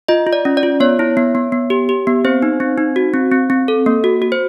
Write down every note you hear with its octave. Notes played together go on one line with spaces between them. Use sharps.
F4 D#5
F4
D5
C#4
D5
F4
B3 C#5
E4
B3
B3
B3
G4
G4
B3
C4 C5
D#4
C4
D#4
F#4
C4
C4
C4
A4
A#3
F#4
F#4
C5